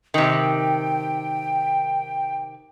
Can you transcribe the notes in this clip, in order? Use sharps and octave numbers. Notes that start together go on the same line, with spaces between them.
C3 D#3 G5